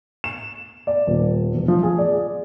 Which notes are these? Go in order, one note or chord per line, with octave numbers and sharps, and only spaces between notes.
E7
D5
D#1
E1
F3
G#4
D5
G#4